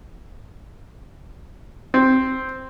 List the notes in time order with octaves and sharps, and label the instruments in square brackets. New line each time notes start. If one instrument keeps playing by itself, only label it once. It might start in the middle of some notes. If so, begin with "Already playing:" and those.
[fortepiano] C4